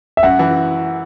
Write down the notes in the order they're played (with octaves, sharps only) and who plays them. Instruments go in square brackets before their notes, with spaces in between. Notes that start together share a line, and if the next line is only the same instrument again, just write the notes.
[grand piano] E5
[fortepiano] F#2 [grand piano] F#5
[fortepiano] E3